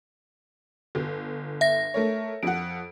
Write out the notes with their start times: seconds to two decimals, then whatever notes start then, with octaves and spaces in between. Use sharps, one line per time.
0.95 G1
1.61 E5 A#6
1.94 A3 A#4 C#5
2.43 F2 F#5 D7